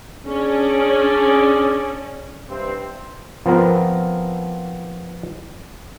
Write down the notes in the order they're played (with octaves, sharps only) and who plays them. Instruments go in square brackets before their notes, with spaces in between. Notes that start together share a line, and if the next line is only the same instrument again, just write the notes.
[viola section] C#4 [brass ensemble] D4 G#4 D5
[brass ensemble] G2 C3 C4
[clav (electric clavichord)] F3 B3 C4 A#4